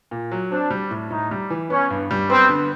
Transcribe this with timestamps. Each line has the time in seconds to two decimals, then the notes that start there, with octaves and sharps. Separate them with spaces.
0.11 A#2
0.32 F#3
0.51 C4 D4
0.71 G3
0.91 A2
1.11 A2 D#4
1.31 G3
1.50 E3
1.70 B3 C#4
1.90 G2
2.11 G3
2.30 B3 C4
2.49 D3